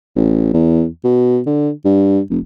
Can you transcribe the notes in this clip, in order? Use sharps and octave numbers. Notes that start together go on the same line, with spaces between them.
A1
E2
B2
D3
G2
F1